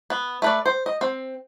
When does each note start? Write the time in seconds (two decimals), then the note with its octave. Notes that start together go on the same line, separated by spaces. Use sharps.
0.10 B3
0.42 A3 B4 D5
0.66 C5
0.86 D#5
1.01 C4